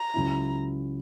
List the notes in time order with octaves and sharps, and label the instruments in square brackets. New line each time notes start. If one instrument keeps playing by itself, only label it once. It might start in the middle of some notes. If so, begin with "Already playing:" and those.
Already playing: [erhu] A#5
[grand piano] C#2 C#3 F#3 C#4 E4